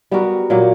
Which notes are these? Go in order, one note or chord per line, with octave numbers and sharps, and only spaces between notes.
G3 B3 F#4 A#4
A#2 F#3 A#3